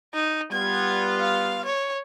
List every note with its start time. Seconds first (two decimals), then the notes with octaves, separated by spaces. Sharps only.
0.14 D#4
0.52 G3 B3 F4 G#6
1.20 F5
1.65 C#5